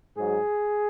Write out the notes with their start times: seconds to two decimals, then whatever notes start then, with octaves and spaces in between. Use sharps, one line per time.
0.15 G#2 F#3 G#4